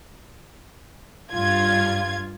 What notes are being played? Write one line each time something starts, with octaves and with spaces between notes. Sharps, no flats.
G2 F4 G#6